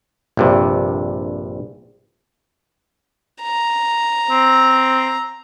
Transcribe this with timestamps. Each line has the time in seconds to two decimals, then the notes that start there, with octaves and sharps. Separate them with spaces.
0.37 A#1 G2 C3
3.42 A#5
4.30 C4